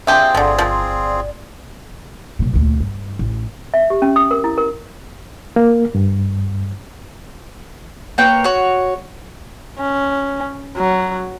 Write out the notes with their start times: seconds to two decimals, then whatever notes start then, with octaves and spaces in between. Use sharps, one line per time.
0.07 C4 D4 F4 G4 G#4 E5
0.35 G1 D3 F3 D5
0.58 F3
2.39 B1 A#2
2.54 D2 A#2
2.80 G2
3.19 A1
3.74 E5
3.90 G4
4.02 C#4
4.16 D#6
4.31 A#4
4.44 E4
4.58 A#4
5.56 A#3
5.95 G2
8.18 A#3 B4 C#5 G5
8.44 F#4 C#5
9.79 C#4
10.77 F#3